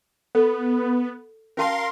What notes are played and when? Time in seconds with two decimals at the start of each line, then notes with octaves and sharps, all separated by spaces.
0.35 B3 A4
1.57 C#4 F#4 A#4 F5 A5 C6